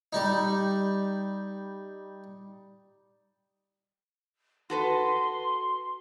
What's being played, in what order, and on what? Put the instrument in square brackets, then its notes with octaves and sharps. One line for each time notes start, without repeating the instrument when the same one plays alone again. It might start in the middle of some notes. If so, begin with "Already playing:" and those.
[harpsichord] G3 D#4
[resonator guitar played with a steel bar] F#4 A4 B4 [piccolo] C6